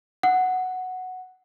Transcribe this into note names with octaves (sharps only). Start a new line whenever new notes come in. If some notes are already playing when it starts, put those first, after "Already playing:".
F#5